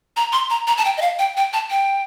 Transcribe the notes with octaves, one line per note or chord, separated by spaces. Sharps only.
A#5
C6
A#5
A#5
A5
G5
D#5
F5
G5
G5
A5
G5